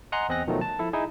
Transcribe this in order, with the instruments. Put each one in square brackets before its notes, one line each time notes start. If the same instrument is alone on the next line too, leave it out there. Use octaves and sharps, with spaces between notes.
[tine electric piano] D#5 F#5 G#5 A#5 C6 F#6
E2 C4 D#5 G#5 F#6 A#6
B2 D#3 F3 F#3 A3
A5
F3 E4 A4
D#4 E4 G#4